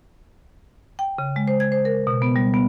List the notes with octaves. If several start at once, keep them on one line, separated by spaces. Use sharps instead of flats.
G5
C#3
G#3
C5
G#6
C5
A#4
B2
B3
G3
B3